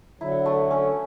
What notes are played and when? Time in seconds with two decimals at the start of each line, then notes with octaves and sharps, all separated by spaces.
0.20 D3 F#3 E4
0.46 A3
0.71 C#4